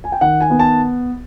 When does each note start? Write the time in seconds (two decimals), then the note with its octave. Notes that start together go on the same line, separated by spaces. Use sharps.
0.04 G#5
0.12 G5
0.21 D#3 F#5
0.41 G#5
0.50 B3
0.59 A5